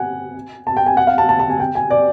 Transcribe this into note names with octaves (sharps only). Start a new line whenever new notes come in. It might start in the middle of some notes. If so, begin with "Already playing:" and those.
Already playing: F#5 G#5
A5
G5
G#5
F#5
F5
A5
A5
A5
G#5
G5
G#5
D5